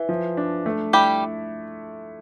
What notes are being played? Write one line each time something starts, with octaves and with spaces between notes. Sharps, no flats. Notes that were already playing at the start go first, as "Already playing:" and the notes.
Already playing: E3 E4
F3
D4
A3
G3 E4 G4